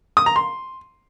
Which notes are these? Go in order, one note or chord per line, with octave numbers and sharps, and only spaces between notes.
D#6
A#5
C6